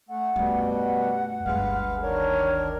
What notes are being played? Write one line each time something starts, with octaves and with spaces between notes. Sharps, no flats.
A3 F#5
F#2 B2 G3 A3
F#5
G1 D2 G#3 B4 F5
D#3 D4 A#4 C#5